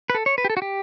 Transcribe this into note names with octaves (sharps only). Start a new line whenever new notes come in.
B4
A4
C#5
B4
G4
A4
F#4
G4